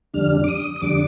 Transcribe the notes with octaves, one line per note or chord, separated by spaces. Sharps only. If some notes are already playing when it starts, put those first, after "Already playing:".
F2 D3 G3 D4 F6
D6
D#6
D#6
F2 D3 G3 D4 D6